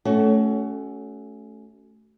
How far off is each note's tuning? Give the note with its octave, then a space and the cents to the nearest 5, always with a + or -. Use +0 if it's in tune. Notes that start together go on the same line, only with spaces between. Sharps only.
A3 -15 C#4 +10 F#4 +30